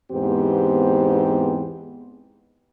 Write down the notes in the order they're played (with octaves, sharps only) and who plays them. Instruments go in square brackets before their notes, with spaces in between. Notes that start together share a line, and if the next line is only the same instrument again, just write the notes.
[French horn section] E2 G#2 B3 C4 G4